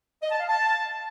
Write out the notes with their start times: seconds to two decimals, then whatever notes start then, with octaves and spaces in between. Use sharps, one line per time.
0.23 D#5
0.31 A5
0.40 F5
0.49 A5